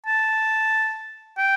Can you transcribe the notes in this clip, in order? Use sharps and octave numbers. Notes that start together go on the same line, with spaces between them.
A5
G5